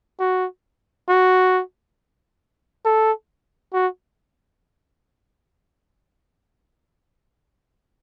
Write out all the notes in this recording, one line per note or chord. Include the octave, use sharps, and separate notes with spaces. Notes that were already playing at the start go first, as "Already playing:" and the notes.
F#4
F#4
A4
F#4